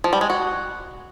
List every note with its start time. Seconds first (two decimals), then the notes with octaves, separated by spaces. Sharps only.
0.04 F3
0.13 G3
0.21 G#3
0.30 F#4